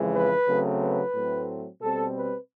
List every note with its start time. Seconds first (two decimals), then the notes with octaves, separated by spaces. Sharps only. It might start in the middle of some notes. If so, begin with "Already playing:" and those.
Already playing: F2 C#3 E3 G#3
0.14 B4
0.48 C#3 F#3 A3 C4
0.81 B4
1.14 A2 F#3 A3 C4
1.81 B2 G3 C4 A4
2.15 B4